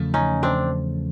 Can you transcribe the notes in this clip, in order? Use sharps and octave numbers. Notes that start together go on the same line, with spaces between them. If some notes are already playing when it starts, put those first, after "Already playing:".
Already playing: E2 C#3 F3 A3
C#4 D#4
C4 D4